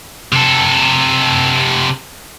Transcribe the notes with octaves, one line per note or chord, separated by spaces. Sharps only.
C3 A4